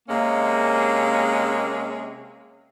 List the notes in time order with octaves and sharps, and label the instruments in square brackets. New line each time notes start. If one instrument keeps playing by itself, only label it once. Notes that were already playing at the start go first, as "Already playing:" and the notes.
[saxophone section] C3 G#3 C#4 [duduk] A#3